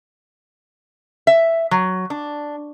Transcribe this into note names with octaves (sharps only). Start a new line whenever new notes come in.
E5
F#3
D4